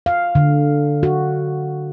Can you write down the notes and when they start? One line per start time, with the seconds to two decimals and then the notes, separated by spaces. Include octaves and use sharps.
0.06 F5
0.35 D3
1.03 F#4